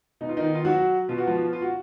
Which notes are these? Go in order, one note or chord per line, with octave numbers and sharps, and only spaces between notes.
B2 D#4
F4
D#3 D#4
F4
F#3 F#4
B2 F4
F#4
F3 F4
F4
F#4